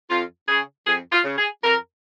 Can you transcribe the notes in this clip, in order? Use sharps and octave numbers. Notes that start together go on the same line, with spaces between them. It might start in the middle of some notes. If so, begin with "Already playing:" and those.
F2 F4
C#3 G#4
F2 G#4
F4
C#3
G#4
F2 A#4